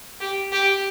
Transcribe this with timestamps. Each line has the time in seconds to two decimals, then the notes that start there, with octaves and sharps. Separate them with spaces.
0.21 G4
0.52 G4